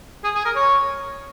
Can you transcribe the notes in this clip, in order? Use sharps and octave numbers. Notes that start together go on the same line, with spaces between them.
G#4
G#4
A#4
C#5